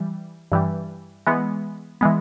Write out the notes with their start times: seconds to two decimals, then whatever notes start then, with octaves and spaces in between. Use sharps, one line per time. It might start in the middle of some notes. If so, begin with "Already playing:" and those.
Already playing: E3 G3
0.52 G2 E3 G3
1.27 E3 G#3 B3
2.01 E3 G#3 B3